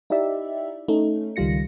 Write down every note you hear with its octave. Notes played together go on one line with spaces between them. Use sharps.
D#4 E4 G4 D5 E5
A3 C#4 D#4
C#2 D#3 G3 F4 A#6 C#7